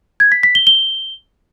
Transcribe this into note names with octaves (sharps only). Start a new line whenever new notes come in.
G#6
B6
B6
G7
G7